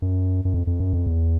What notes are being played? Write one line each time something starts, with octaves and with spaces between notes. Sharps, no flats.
F#2
F#2
F2
F2
F#2
F2
E2